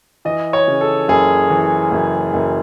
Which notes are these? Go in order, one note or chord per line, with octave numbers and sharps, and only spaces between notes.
E3 D#5
C#5
C#3
A4
F#1 G#4
E3
F#1
F#1